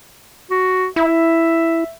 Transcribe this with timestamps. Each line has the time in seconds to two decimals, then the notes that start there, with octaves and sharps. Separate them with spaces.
0.50 F#4
0.96 E4 E5